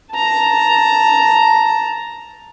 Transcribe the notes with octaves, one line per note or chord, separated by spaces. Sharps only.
A5 A#5